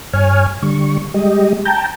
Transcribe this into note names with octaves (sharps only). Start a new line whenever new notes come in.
G2 C#5 G#5 F6
D3 G3 C#6
G3 G#3 G4 D#5
G5 A5 A#5 G6